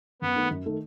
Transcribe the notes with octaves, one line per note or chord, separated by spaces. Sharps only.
F#2 B3
D#3 A3 D#4
F#2
D#3 A3 D#4